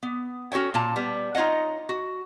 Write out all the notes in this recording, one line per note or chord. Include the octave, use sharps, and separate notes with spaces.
B3
C#4 F#4 A4 C#5 G5
A#2 F4 A5
G3 B3
D#4 F4 C#5 D#5 F#5
F#4